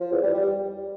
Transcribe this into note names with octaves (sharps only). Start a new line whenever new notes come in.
F3
E2
G3
G3